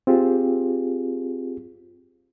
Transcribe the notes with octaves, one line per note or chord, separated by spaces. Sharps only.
C4 F4 G4 G#4